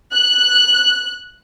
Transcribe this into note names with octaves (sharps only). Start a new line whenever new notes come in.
F#6